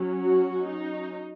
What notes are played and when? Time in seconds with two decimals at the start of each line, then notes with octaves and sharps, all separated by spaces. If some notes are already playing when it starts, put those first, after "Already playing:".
Already playing: F#3 C#4
0.12 F#4
0.65 D#4